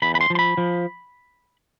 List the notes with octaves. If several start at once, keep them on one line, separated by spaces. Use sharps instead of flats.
E2 B5
B5
C6
F3
C6
B5
F3